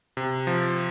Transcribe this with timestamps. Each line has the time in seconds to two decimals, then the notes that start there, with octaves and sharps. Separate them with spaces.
0.17 C3
0.47 F3